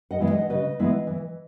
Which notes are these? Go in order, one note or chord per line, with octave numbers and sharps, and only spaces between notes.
D#5 F#5
E3 G#3 B3 E4
D#5 F#5
C#3 B4 D#5
E3 G#3 B3 E4
E3